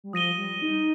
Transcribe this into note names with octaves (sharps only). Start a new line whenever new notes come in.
G3
F3 D#6 A#6 D#7 G7
G3
D#4